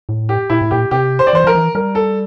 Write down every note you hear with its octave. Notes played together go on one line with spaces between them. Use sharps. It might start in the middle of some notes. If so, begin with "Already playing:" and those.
A2
G4
A#2 E4
A2
A#2 G4
C3 G4
C5
D5
E3 C5
F3 A#4
E3
G3 A#4
A4